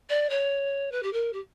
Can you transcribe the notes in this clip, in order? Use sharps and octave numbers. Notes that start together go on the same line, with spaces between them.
D5
C#5
B4
G4
A#4
G4